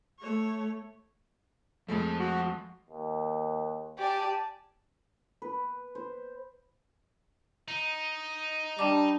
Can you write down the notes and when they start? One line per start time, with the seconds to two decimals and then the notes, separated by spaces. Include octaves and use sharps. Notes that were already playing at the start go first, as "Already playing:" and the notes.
0.20 A3 C#5
1.88 F2 F3 G#3 A3 A5
2.19 F#4
2.90 D#2
3.99 G4 D5 G#5 A5
5.42 B4
5.95 C5
7.68 D#4
8.79 G3 D4 A5 D6